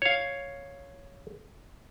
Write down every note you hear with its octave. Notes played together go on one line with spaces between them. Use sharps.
C#5 F5